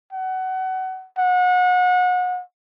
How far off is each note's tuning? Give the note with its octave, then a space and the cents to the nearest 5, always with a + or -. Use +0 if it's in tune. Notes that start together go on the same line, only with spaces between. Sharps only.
F#5 +25
F#5 -30